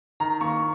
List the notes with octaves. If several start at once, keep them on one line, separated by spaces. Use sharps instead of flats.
D#3 A#5
A#3 C#6